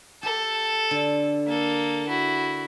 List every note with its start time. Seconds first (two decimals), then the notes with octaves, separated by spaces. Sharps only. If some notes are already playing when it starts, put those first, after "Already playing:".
0.23 G4 A4
0.91 D3
1.47 A#3 A4
2.08 E4 F#4